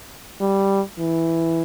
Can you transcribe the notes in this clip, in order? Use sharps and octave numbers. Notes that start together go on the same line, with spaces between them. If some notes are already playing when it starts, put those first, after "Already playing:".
G3
E3